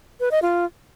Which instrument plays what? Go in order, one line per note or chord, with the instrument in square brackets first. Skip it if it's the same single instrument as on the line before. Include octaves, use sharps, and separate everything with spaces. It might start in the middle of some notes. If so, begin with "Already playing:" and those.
[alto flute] B4
D#5
F4